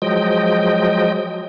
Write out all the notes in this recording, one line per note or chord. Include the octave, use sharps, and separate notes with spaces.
F3 F#3 G#3 D#5 G5